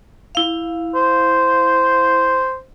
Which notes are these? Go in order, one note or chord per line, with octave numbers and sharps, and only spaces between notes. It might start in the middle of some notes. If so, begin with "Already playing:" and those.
E4 F5
C5